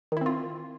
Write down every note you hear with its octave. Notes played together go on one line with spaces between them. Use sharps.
D#3 C4 E4 F4